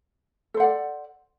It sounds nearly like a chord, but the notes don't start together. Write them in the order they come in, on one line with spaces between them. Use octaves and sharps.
A4 C5 F#5 D5